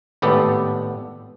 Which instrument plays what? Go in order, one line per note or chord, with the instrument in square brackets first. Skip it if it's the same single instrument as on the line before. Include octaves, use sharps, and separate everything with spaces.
[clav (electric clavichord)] G#1 A2 B3 G4 A4 D5